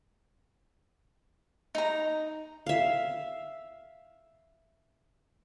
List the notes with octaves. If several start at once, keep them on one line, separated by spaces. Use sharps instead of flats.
D#4 A#5
E5 F5